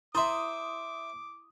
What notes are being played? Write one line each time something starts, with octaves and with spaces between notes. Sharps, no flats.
E4 C5 E5 C6 D6 D#6